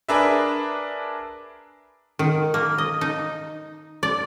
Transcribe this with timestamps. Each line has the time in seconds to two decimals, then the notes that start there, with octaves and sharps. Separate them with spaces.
0.09 D4 G#4 A#4 B4 E5
2.19 D#3
2.54 A#3
2.78 D#5
3.01 D#4
4.03 D5